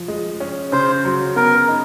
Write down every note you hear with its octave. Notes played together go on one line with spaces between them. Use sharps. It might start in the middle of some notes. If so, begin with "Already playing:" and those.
Already playing: F3
G#3
C#4
C#3 C5
F#3
B3 A#4
D#4